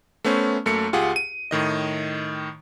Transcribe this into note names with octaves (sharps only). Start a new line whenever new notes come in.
A3 B3 C#4 C5
F#2 A3 A#3 C#7
C#2 F4 G4 G#4 F#5
D#7
A2 D#3 D#5